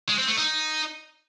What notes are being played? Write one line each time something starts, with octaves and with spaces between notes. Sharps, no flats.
G#3
C4
A3
D#4